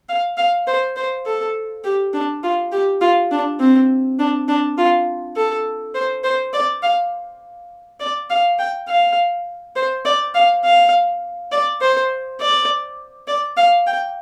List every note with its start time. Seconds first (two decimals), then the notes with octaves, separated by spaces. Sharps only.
0.09 F5
0.38 F5
0.67 C5
0.96 C5
1.26 A4
1.84 G4
2.14 D4
2.44 F4
2.72 G4
3.01 F4
3.31 D4
3.60 C4
4.19 D4
4.48 D4
4.78 F4
5.36 A4
5.95 C5
6.24 C5
6.53 D5
6.83 F5
8.00 D5
8.30 F5
8.59 G5
8.89 F5
9.76 C5
10.05 D5
10.35 F5
10.64 F5
11.52 D5
11.81 C5
12.41 D5
13.28 D5
13.57 F5
13.87 G5